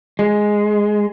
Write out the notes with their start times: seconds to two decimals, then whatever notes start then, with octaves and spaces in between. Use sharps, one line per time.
0.19 G#3